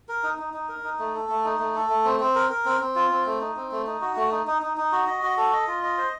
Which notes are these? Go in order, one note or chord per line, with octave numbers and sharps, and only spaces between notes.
A#4
D#4
D#4
D#4
A#4
D#4
A3
A4
A3
D#4
A3
A4
A3
C4
C4
A#4
A#4
C4
C4
F4
C4
A3
D#4
C4
A3
D#4
F#4
A3
D#4
D#4
D#4
D#4
F#4
D#5
F#4
A4
D#5
F4
D#5
C5